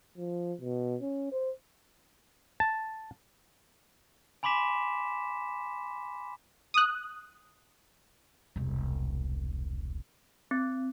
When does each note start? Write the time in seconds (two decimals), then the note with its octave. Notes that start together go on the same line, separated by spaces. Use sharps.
0.17 F3
0.61 B2
1.02 C#4
1.32 C5
2.60 A5
4.43 G#5 B5 C6 D6 B6 E7
6.74 D#6 F#6
8.56 E1 C2
10.51 C4